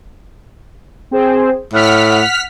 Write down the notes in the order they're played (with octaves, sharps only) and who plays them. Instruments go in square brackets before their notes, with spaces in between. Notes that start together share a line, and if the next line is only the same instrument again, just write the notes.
[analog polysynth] C4 G#4 C5
[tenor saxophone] A2 [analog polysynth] F#5 F6 B6